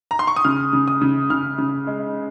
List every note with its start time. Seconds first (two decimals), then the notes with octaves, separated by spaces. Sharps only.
0.11 A#5
0.19 C6
0.27 C#6
0.36 D#6
0.44 C#3 F6
0.73 C#3
0.88 D#6
1.02 C#3
1.30 C#3 F6
1.58 C#3
1.87 G#3